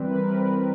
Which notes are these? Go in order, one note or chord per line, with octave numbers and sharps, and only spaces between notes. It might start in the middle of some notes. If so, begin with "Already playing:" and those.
Already playing: E3 G3 C4 B4
A#4
B4